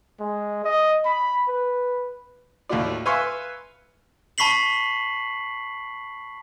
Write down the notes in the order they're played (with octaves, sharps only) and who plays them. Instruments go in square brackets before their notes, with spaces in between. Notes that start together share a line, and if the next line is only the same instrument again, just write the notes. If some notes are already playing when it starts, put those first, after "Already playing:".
[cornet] G#3
D#5
B5
B4
[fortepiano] D#2 A2 F4 F#4 D5
B4 E5 F5 G#5 C6 C#6
[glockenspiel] A5 B5 C#6 B6 C7 F#7